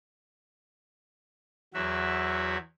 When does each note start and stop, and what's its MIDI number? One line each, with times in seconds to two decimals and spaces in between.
1.74 2.57 40
1.74 2.57 54
1.74 2.57 66
1.74 2.57 76